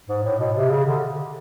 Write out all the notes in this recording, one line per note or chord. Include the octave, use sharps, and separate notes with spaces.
G#2
A2
B2
C3
C#3
D3